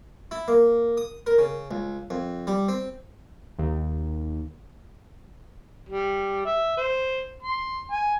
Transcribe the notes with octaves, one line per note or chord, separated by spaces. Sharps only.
E4
A#3
D#6
A#4
C#3
C#2
F2
G3
C4
D#2
G3
E5
C5
C6
G#5